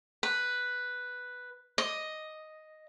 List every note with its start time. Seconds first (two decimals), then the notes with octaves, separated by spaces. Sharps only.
0.23 B4
1.78 D#5